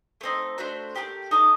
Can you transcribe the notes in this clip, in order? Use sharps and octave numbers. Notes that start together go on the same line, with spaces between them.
A3 C4 D#4
A3 D4 F#4 C5
A3 D4 G4 A#4
D#4 A4 D#5